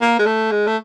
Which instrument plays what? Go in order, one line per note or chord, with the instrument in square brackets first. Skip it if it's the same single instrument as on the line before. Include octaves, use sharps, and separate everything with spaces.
[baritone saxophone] A#3
G#3
A3
G#3
A3